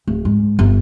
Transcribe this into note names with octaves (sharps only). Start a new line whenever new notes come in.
D1
G#2
G1